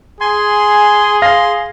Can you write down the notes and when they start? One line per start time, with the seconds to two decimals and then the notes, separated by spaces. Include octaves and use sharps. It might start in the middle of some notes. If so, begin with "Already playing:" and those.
0.21 G#4 G#5 C6
1.22 F5 C6 A#6